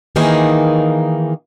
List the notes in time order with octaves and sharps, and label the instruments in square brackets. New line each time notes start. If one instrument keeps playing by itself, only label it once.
[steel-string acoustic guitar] D#3 E3 A#3 D#4 G#4